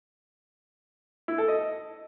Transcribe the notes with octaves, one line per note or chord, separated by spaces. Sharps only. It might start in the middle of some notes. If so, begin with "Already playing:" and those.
E4
A4
D#5